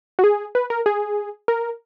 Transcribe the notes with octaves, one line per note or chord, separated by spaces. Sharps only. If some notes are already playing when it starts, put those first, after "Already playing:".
F#4
G#4
B4
A#4
G#4
A#4